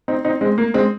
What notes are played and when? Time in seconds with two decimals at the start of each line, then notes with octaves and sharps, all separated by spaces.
0.08 C4 D#4
0.25 C4 D#4
0.41 G#3 C4
0.58 A#3
0.74 G#3 C4